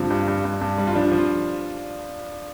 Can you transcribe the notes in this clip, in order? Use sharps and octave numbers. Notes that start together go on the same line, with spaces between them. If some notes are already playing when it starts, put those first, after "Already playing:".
Already playing: G2 D3 F3 C4
G2
G2
G2
G2
G3
F4
F3 D4
F3
F4